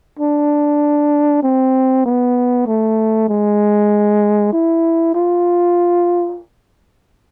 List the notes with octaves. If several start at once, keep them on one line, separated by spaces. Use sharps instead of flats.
D4
C4
B3
A3
G#3
E4
F4